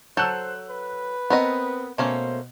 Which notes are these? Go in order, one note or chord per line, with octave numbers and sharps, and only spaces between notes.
F#3 A4 C5 A5 E6 F#6 G6
B4
B3 C4 A#4 D#5
B2 A3 A#3 C#4 C5